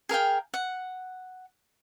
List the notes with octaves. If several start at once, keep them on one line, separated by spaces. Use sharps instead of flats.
G#4 A#4 F5 G5
F#5